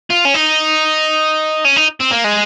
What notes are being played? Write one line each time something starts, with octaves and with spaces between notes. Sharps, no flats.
F4
C#4
D#4
C#4
D#4
C4
A#3
G#3